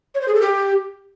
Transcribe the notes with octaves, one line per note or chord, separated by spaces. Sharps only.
C#5
C5
G#4
A4
G4